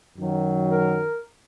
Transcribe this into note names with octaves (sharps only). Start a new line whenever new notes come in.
F#2 D#3 F#3
A#4